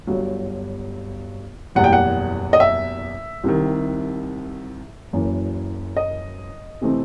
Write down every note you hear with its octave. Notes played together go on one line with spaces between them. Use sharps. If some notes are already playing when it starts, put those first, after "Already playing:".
G1 G2 F#3
F#1 E2 B2 G3 F#5
G5
F#5
D#5
E5
C2 C3 D#3
F#1 F#2 E3
D#5
C3 E3 A3 C4